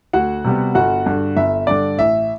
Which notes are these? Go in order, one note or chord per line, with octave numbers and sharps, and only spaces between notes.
D2 F#4 F#5
C3 G3 B3
G1 F#4 F#5
G2 D3
G1 E5
G2 D3 D5
A1 E5